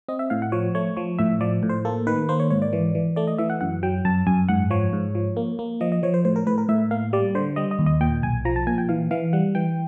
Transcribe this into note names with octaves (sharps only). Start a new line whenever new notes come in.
C4 D#5
E5
A2 F5
F#5
F3 C#5
A3 C#5
F3 C#5
A2 E5
F3 D5
A2
C5
A#3 A4
D#3 B4
A#3 C5
C#5
G#2 C#5
D5
E3
E3
A3 D5
D#5
E3 E5
F#5
F#2 F#5
F#3 G5
F#2 A5
F#2 G#5
G#2 F#5
F3 C#5
G#2
F3
A#3
A#3
F3 D#5
D#5
F3 C#5
C5
A2 C5
A#4
A2 B4
A#4
A2 E5
A#3 F5
G3 D5
D3 C5
G3 D#5
D#5
D#2
D#5
A#2 G5
B1 G#5
F3 A#5
A5
A#2 G#5
G5
E3 F5
E3 F5
G3 F#5
E3 G5